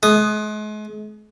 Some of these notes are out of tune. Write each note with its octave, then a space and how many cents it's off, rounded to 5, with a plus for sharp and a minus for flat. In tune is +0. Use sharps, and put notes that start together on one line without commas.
G#3 +40 D#6 +0